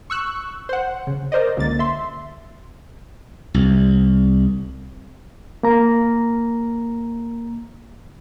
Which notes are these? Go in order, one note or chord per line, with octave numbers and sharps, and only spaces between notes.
C#6 E6 F#6
C5 F#5
C#3
A#4 C5 D5 D#5
C#2 D3 A#3 A6
E5 C6
C2
A#3 A#5